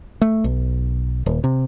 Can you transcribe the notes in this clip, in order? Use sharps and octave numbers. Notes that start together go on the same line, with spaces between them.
A3
B1
D#1
C3